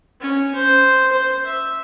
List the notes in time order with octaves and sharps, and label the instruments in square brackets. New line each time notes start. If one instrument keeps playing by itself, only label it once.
[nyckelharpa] C#4
C5
C5
E5